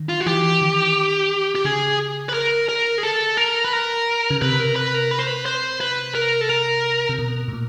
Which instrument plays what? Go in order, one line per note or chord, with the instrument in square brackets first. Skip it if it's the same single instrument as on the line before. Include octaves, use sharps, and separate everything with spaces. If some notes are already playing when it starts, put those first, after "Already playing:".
Already playing: [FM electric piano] D#3
[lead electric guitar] F4
F#4
[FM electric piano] E3 [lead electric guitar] G4
[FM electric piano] D#3
[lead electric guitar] G4
[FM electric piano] C#3 [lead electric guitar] G#4
[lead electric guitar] B4
A#4
A#4
G#4
A4
A#4
B4
A#4
[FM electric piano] C#3
[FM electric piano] C3 [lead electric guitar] B4
[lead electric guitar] A#4
B4
A#4
B4
C5
B4
C5
B4
A#4
A4
A#4
[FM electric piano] C3
B2
A2
A#2